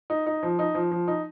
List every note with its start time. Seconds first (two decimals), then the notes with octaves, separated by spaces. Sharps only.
0.10 D#4
0.27 D#4
0.43 F3
0.59 D#4
0.75 F3
0.91 F3
1.08 D#4